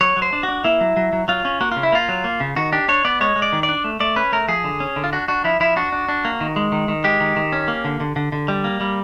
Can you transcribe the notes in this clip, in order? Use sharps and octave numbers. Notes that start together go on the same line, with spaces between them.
F#3 C#5
F#3
C5
D4
F#4
D4
A#3 E4
F#3
F#3
F#3
F#3 F4
C#4
A#3 F#4
F4
C#3
E4
A#3 F4
F#3
A#3
C#3
D#3 F#4
D4 G4
D4 C#5
B3 D5
G#3 C#5
G#3
D5
D#3
D5
D4
A3
A3 D5
C#4 B4
A3 A#4
F3 G#4
D3
C#4
D3
F4
D4 F#4
D4 F#4
F3 E4
F3 E4
D4 F#4
D4
D4
A#3
D#3
G#3
D#3
D#3
G#3 G4
D#3
D#3
C#4
A#3
D3
D3
D3
D3
G3
A#3
G3